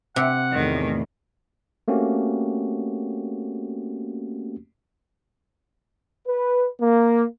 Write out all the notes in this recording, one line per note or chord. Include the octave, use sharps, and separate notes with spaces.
C3 F#5
E2 A2 D#3
A3 A#3 C4 C#4 F#4 G4
B4
A#3